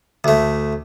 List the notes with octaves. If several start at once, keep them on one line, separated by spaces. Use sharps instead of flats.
D2 A3